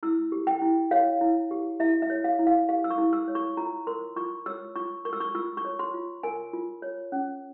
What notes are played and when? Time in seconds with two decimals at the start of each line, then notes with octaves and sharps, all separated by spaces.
0.03 E4 E6
0.32 G4
0.47 G5
0.62 E4
0.91 C#5 F5
1.21 E4
1.51 G4
1.80 E4 E5
2.02 E5
2.10 C#5
2.24 F5
2.39 E4
2.47 F5
2.69 G4 F5
2.84 E6
2.90 C#6
2.98 E4
3.13 E6
3.28 C#5
3.35 C#6
3.57 F4 A#5
3.87 A#4 C6
4.16 F4 C#6
4.46 C#5 E6
4.76 F4 C#6
5.05 A#4 C#6
5.13 E6
5.21 C#6
5.35 F4 E6
5.57 C#6
5.65 C#5
5.79 C6
5.94 F4
6.23 A#4 G#5
6.53 F4
6.82 C#5
7.12 C#4